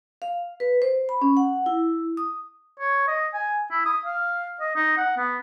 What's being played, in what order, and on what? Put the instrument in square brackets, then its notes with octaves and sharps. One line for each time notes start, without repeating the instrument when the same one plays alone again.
[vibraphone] F5
B4
C5
B5
C#4
F#5
E4
D#6
[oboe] C#5
D#5
G#5
E4
D#6
F5
D#5
D#4
F#5
B3